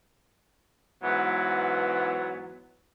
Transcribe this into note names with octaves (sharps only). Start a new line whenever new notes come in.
G#2 E3 F#3 B3